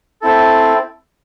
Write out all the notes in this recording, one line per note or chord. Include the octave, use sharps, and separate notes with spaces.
C4 E4 A4